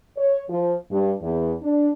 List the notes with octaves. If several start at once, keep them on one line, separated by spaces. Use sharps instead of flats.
C#5
F3
G2
E2
D4